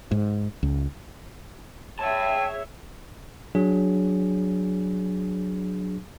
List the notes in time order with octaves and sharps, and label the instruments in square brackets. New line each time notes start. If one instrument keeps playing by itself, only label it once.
[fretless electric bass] G#2
C#2
[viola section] G#4 C#5 E5 [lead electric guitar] G5 A5
[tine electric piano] F#3 D4 G#4